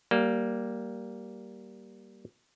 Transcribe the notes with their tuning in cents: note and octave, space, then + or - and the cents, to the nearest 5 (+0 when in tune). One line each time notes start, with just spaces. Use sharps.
G3 -15 A#3 +5